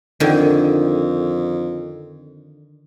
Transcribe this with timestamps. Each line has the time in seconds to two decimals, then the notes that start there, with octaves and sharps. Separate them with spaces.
0.20 F2 D3 D#3